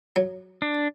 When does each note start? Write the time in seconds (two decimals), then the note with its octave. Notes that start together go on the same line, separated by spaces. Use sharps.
0.16 F#3
0.62 D4